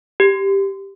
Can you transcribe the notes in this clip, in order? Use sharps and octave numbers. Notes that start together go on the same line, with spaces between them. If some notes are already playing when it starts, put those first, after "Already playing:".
G4